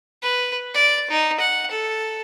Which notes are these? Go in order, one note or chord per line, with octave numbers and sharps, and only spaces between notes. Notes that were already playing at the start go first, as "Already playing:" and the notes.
B4
D5
D#4
F#5
A4